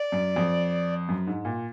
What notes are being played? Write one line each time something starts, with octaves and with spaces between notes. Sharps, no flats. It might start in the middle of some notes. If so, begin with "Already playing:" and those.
Already playing: D5
F#2
F2
F#2
G#2
A#2